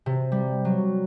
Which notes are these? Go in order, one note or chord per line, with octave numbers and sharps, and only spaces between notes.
C3
G3
F#3